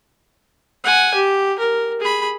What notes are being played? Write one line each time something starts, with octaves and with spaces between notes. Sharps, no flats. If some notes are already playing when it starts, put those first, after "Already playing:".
F#5 G#5
G4
A#4
G#4 B5